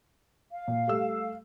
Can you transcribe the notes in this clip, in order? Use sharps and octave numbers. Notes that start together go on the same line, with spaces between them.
F5
A#2
G3 A3 E6